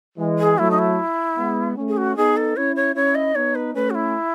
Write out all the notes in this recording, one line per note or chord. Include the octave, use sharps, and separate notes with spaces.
E3 G#3
G#4
F#3 A3 E4
D#4
E4
G#3 B3
A3 C#4
G#4
F#4
B3 D#4 G#4
A4
C#4 E4 C#5
C#5
C#4 E4 C#5
D#5
B3 D#4 C#5
B4
A3 C#4 B4
F#4
E4